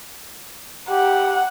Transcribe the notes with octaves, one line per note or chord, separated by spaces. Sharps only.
G4 F#5